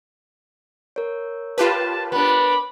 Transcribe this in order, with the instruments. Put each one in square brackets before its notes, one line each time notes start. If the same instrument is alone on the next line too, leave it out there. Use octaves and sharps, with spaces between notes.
[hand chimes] A#4 C#5
[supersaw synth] F4 G4 B4 [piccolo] A5
[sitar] B3 D4 [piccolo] B5